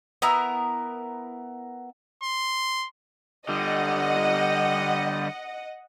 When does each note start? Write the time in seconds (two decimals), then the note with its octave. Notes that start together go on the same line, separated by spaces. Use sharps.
0.22 B3 E4 A#4 A#5
2.23 C6
3.49 D3 G3 D#5 F#5